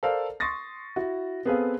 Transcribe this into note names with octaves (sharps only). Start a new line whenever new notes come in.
A4 A#4 C5 D5 F5 A5
C6 C#6 D#6 A6 A#6
E4 F#4
B3 C4 G#4 A4 B4 F5